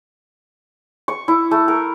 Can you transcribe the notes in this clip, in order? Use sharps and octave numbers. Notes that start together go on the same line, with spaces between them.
C#6
E4
A3
A#4